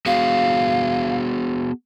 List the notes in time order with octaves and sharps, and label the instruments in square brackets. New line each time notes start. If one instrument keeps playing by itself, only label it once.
[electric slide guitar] B3 F#4 G#4 [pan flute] F5